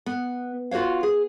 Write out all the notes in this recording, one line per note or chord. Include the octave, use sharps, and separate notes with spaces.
B3
F4 F#4 C5 C#5 F5
G#4